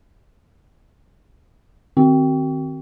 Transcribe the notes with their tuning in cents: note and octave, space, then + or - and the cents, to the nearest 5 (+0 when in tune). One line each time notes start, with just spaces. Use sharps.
D#3 -10 C4 +0 F#4 +35